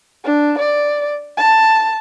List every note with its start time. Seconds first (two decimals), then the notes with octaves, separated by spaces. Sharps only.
0.24 D4
0.58 D5
1.37 A5